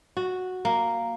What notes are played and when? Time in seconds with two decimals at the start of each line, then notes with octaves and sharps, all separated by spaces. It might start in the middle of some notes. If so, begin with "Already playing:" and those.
0.17 F#4
0.65 A#3